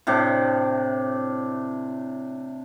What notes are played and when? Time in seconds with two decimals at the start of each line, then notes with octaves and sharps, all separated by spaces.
0.07 A2 C3 D4